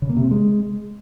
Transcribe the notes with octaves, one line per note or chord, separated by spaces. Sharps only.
C#3
A#3
C3
C4
G#3